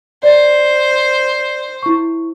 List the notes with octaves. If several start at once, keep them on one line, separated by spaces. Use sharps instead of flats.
C5 D5
E4 C#6